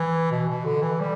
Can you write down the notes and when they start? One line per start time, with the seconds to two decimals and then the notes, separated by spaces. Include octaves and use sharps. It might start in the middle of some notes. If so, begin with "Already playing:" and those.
Already playing: E3
0.32 B2
0.49 B2
0.65 D3
0.82 E3
1.00 G3